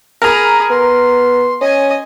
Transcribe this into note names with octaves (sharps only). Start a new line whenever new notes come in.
G#4 A#4 A#5 B5
B3 C6
C#4 D#5 G#5